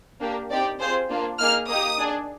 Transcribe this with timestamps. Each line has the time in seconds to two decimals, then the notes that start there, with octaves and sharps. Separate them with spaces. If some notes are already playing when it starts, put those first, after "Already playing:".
0.21 A#3 D4 G4
0.50 C4 D#4 G4 D5
0.80 C4 F4 G#4 C5
1.09 A#3 D4 F4
1.39 A#3 D#4 G#4 F6
1.69 A#3 D#4 G4 D#6
1.99 D4 G#4